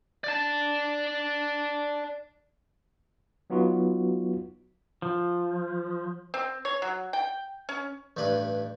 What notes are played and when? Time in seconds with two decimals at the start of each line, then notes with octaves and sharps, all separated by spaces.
0.24 D5 A5
3.50 F#3 B3 D#4 F4 F#4
5.02 F3
6.34 C4
6.65 C#5
6.82 F#3
7.13 G5
7.69 C#4
8.17 A1 G2 D4 B4